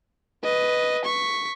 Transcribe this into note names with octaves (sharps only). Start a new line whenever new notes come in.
B4 D#5
C#6 B6